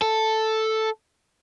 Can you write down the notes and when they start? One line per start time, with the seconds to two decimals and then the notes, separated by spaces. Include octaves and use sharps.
0.02 A4